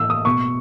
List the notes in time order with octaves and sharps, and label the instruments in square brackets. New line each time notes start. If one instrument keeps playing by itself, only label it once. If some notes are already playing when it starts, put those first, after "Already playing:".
Already playing: [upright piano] A2 E3 E6
D#6
B2 C#6